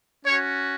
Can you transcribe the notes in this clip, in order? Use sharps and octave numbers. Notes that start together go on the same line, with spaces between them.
C#4 F#4 C#5